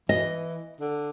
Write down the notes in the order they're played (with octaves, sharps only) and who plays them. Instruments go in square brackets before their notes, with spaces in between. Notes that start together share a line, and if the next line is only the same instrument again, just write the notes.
[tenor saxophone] E3 [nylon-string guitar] D#5
[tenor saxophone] D3